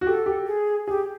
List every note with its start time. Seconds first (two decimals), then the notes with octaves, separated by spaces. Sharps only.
0.01 F#4
0.07 G4 A4
0.26 G4
0.47 G#4
0.87 G4 G#4